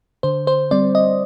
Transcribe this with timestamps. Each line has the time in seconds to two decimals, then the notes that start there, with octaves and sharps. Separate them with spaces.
0.23 D3 C5
0.47 C5
0.71 G3 C4 D5
0.95 D#5